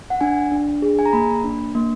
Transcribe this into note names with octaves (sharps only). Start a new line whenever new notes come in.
F#5
D4 G#5
D4
G#4
G#5
A#5
A#3 B5
D4
A#3